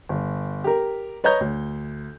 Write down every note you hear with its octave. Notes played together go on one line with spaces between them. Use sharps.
G1
G4 A#4
B4 C#5 D#5 A#5 G6
D2